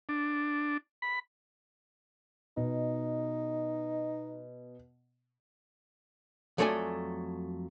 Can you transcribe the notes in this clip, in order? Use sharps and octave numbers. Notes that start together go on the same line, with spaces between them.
D4
B5
B2 D#4
F2 F#3 A3 A4 D5 G#5